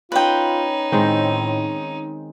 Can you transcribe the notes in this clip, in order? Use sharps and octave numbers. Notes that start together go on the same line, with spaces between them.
C#4 D#4 F4 B4 G5
A2 D#3 G#3 C4